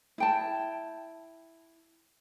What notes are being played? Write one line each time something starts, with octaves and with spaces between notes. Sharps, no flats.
E4 G5 A5